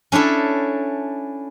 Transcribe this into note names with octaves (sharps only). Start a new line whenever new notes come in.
C#4 D4 E4 A4